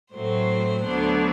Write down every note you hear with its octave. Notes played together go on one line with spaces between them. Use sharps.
A2 F#3 A3 C4 C5
D2 D3 F#3 B3 D4